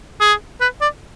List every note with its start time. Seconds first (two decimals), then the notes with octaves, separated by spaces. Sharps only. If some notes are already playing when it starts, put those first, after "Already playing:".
0.21 G#4
0.61 B4
0.81 D5